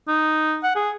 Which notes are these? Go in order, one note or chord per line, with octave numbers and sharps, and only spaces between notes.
D#4
F#5
G#4